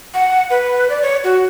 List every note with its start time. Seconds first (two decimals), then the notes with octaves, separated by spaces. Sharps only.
0.14 F#5
0.50 B4
0.90 D5
1.03 C#5
1.24 F#4